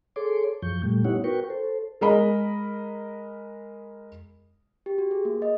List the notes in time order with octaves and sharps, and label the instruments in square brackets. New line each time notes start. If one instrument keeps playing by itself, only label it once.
[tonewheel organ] G#4 A4 C#5 C6 D6
F#2 F3 C#6 G6
A#2 G3 A3
B3 D#4 E4 G4 C#5 F#5
F#4 A#4 B4 G5 C#6
A4 C5
[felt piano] G#3 A#4 D#5 B5
[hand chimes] G4
F#4
G#4
A#3
D#5